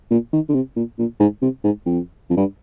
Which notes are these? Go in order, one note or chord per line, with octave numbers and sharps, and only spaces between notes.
A#2
D#3
D3
C3
A#2
A#2
G#2
C3
G#2
F2
F2
G2